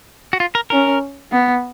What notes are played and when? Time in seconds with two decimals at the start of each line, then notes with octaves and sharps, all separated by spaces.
0.33 F#4
0.40 F4
0.55 A#4
0.70 C#4 A#4
1.32 B3